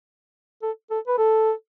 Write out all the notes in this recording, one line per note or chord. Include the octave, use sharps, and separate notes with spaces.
A4
A4
B4
A4